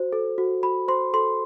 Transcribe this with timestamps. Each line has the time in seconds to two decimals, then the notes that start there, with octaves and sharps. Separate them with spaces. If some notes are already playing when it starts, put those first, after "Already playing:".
Already playing: F#4 C5
0.13 A4
0.38 F#4
0.63 F#4 B5
0.88 C5 C6
1.14 A4 C6